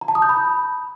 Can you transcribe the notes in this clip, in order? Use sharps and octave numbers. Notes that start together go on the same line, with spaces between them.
A#5
A5
D#6
G6
B5